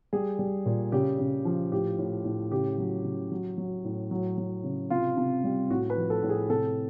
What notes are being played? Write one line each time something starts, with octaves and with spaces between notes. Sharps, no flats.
G3 G#4
G3
A#2
C#3 G4
C#3
F3
A2 G4
A2
A2
C#3 G4
F#3
C#3
F#3
F#3
A2
F#3
F#3
C#3
C3 F4
C3
G3
A2 F#4
B4
F3
A4
A2
G#4
C3 A4